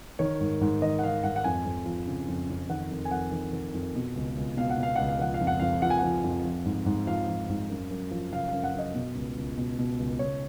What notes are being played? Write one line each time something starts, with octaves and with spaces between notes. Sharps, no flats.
D#3 C#5
G#2
G#2
D#3 D#5
F#5
D#3 F5
G#2 F#5
F#5
F2 G#5
F2
F3
C#3
F2
F2
D#3 F#5
F2
G#5
F2 F#5
D#3
D#3
F2
B2
C#2
C#2
B2 F5
F#5
B2
F5
C#2 F#5
F5
F3 F#5
F5
F2
F#5
F2 F5
F3 F#5
G#5
F3 F#5
F2
F3
G#2
G#2
F3 F5
F3
G#2
F#2
F#2
F3
C#3 F5
F5
F#2
F#5
F#2 D#5
B2
C#2
C#2
B2
B2
C#2
C#2 C#5